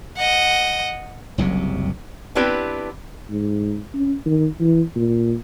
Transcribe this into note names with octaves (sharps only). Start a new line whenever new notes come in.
D#5 F#5
F#1 C2 C3 F#3
B3 C4 D4 E4 G4 B4
G#2
C#4
D#3
E3
A#2